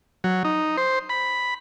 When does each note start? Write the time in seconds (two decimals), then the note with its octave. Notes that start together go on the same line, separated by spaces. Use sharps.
0.24 F#3
0.44 D#4
0.77 C5
1.09 B5